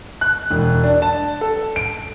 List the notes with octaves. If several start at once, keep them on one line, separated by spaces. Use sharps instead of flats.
F#6
E1
D4
A5
A4
D7